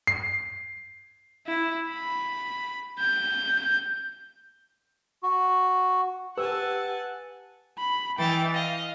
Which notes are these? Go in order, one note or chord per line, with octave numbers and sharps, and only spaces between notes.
C7
E4
B5
G6
F#4
G4 B4 F#5 G#5 A5 E6
B5
E3 E4 D#5 G5 A6
D#5 F5